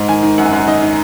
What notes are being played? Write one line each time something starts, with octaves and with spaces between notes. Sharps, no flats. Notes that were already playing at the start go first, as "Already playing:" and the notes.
Already playing: G#2
D#3 G#5
D#3
F#2 F#5
G#5
F#2 F#5
D#3 D#5
D#3